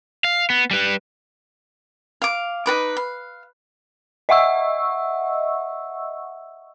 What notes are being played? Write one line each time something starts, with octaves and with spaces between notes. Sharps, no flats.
F5
B3
G3 B4
F5 D6
D#4 F#4 B4 D6
F5
D#5 E5 F#5 C#6 E6